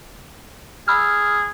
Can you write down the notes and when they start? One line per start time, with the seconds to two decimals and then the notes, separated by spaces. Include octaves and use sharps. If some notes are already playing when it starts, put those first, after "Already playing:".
0.88 G#4 B5 E6 F6